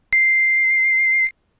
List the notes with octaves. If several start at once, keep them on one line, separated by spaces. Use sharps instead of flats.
C7